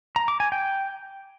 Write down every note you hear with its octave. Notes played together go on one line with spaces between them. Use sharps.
A#5
D6
G#5
G5